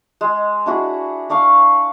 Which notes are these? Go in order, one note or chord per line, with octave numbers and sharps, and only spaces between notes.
G#3
D4 E4 F#4 G#4
D4 D5 F5 C#6